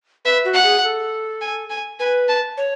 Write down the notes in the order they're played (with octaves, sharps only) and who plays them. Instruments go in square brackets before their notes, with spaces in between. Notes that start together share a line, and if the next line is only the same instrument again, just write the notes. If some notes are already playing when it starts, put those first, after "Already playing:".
[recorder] B4 [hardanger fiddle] E5
[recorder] F#4
[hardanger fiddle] F#5
[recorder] G#4
A4
[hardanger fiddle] G#5
G#5
[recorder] B4 [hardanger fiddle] G#5
[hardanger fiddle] A5
[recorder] C#5